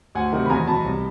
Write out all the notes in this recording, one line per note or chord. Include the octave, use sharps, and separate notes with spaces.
D2 F#5 G#5
C3 D#3 F#3
B5
E2 G#5 A#5
B2 F#3 A5 B5
C2